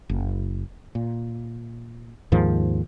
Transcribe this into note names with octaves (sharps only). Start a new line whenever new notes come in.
F#1
A#2
D#2 G#2 D#3 F3